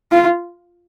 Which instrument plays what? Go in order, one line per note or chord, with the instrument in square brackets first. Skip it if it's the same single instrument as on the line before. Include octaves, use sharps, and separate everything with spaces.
[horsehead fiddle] F4